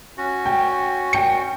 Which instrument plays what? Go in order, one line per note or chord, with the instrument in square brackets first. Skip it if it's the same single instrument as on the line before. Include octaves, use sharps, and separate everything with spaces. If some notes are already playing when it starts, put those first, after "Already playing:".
[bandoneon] C#4 F#4
[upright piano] G5
G5 C#7